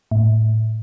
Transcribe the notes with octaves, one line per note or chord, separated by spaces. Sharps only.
A2